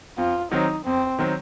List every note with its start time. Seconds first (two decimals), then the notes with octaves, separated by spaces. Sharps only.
0.18 F2 F4
0.51 D#3 F#3 C4 D#4
0.86 F2 C4
1.19 D#3 F#3 C4